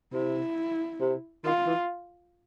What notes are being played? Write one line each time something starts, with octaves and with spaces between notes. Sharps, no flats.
C3 E4
C3
D#3 F4
E3